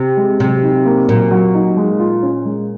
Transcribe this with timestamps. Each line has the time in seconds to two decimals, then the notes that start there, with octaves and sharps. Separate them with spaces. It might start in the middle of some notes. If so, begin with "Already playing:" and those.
Already playing: C3
0.17 G#3
0.40 C3 F#3
0.63 D#4
0.85 A#3
1.09 A#2 F#3
1.31 F#3
1.54 D#4
1.77 G#3
2.00 F4
2.23 C#4
2.45 G#3